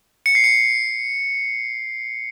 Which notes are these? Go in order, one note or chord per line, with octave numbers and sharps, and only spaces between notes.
C#7
C7
C#7